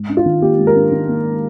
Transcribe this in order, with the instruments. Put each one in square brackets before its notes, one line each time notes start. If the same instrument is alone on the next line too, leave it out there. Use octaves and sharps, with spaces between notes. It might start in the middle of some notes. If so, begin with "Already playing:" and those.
Already playing: [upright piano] G#2
D4
F4
D#3
A#3 G4
G#2
A#4
D4
D#3
A#3